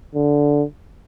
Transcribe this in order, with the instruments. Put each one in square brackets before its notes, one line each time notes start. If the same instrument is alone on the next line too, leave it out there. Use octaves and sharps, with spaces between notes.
[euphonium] D3